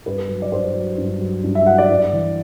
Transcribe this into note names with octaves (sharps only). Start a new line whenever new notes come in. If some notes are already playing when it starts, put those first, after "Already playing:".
G2 B4
F#3
D5
G2 C5
F#3
G2
F#3
G2
E5
F#3 F#5
D5
G2
E3